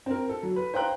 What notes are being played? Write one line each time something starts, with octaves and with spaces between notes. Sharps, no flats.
C4 A#4
A4
F#3
B4
C5 F5 G5 A#5 F#6